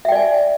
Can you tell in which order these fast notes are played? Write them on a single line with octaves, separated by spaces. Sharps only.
E5 G5 D5 G#5